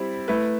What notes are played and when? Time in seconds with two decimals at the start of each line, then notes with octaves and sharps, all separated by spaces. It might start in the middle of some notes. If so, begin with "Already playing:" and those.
Already playing: G3 C4 E4
0.28 A3 E4 B4